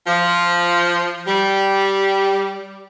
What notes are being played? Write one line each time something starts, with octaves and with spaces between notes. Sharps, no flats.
F3
G3